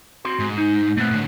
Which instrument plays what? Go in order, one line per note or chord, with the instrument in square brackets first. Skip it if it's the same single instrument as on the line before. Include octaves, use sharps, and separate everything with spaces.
[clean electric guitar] C4 F#4 C6
[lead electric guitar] G#2
[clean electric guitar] D#4
[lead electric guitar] A#2 C4 [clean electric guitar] A3 B3
[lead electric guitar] A2 D3